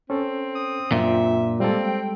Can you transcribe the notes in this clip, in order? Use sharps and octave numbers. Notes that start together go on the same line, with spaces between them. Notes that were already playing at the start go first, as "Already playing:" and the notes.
C4 C#4 A4
D#6
F#2 A#2 D4 F4 E5
G3 G#3 A#3 C4 A4
G5